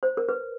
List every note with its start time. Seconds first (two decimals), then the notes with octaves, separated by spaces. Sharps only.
0.03 C5
0.17 A#4
0.29 B4